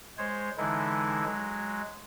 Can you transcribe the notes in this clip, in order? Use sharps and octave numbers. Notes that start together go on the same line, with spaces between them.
G#3 C5 C#5
D3 E3 G#3 D#4 E4
F#3 G#3